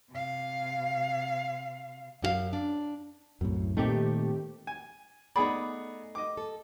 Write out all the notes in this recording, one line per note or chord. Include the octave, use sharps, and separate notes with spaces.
C3 F5
F#2 F#4 F5
D4
C2 F#2 A2
A#2 D#3 A3 C4 G4
G#5
A3 B3 D#4 G#4 D5 B5
D#5 D6
A4